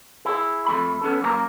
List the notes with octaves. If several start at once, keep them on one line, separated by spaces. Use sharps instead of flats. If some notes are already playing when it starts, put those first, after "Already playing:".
E4 G#4
F2 A3 B5
B3 C#4 A4
F#2 A#3 G#4 A#5